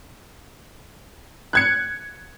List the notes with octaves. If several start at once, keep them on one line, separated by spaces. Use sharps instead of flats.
F#6 G#6 C#7